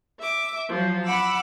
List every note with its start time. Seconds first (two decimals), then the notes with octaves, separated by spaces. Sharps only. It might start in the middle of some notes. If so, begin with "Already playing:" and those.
0.19 E5 D6
0.68 F3 F#3
1.04 F#5 B5 D6 E6